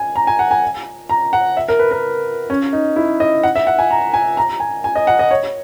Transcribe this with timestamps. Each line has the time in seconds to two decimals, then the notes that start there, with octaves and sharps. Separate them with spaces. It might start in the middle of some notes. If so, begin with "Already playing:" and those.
Already playing: G#5
0.16 A#5
0.27 G#5
0.39 F#5
0.51 G#5
1.10 A#5
1.33 F#5
1.57 E5
1.68 A#4
1.79 B4
1.91 A#4
2.50 C#4
2.73 D#4
2.96 E4
3.20 D#5
3.43 F#5
3.56 E5
3.67 F#5
3.79 G#5
3.91 A#5
4.14 G#5
4.37 A#5
4.60 G#5
4.84 G#5
4.96 D#5
5.07 F#5
5.19 D#5
5.31 C#5